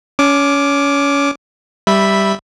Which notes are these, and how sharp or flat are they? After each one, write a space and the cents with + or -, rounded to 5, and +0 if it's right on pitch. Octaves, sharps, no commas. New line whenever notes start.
C#4 +25 D6 +0
G3 +0 E5 +0 B5 +0